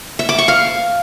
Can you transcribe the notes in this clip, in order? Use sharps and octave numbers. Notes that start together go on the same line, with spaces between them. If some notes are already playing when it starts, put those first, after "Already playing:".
E5
D6
C#6
F5